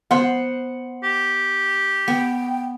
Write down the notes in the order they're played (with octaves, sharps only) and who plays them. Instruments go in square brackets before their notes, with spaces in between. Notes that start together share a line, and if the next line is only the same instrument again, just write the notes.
[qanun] B3 C5 [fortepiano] F#5 C6
[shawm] G4
[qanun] B3 [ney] G5